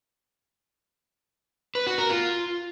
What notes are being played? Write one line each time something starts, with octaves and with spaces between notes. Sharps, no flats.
B4
F#4
A#4
F4